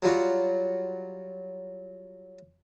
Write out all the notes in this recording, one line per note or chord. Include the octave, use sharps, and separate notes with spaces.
F#3 G3 F4 F#4